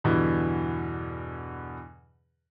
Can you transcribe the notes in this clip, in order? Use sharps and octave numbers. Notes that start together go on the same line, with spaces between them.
E2 G2 B2 D3 E3